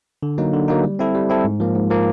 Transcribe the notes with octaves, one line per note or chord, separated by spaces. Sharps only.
D3
F#3 A#3 D#4
D3
F#3 A#3 D#4
G3
C4 E4 A4
G3
C4 E4 A4
G#2
F3 A#3
G#2
F3 A#3